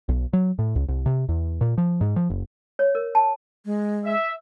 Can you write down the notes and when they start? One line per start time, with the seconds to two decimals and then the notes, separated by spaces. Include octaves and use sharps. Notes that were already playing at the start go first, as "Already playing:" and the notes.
0.09 B1
0.33 F#3
0.59 A2
0.76 C#2
0.89 C2
1.06 C3
1.29 E2
1.61 A#2
1.78 F3
2.01 G#2
2.16 F3
2.30 F#1
2.79 C#5
2.95 A#4
3.15 A5
3.65 G#3
4.05 E5